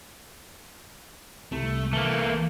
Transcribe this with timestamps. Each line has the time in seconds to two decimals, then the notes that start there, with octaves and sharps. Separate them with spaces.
1.52 C2 A3
1.93 E3 A3 A#3